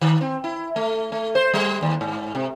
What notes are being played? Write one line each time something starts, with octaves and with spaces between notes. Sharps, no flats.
D#3
C4
E4
A3
A3
C5
G3
D#2
G#2
C3